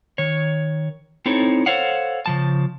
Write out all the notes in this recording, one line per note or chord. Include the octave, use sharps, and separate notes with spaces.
D#3 C#5
C4 D#4 E4 A4 C#5
A4 C5 C#5 F5 F#5
C#3 F3 A5